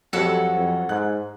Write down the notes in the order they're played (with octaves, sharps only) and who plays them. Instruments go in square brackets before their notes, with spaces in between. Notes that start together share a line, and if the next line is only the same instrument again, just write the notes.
[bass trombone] F2 [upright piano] F#3 G3 [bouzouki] A4 C#5 F#5
[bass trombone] F2
[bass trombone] G#2 [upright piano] F#6